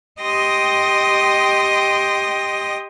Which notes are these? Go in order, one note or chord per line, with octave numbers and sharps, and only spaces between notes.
G4 D#5 G5 C6 D#6 A#6